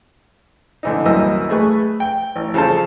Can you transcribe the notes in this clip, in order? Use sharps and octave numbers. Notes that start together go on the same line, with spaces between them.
D3 E3 D#4
C2 F#2 E3 A#3 D#5 E6
A3 G#4 B4 C#6
G5
A1
C#3 F3 A4 C5 A5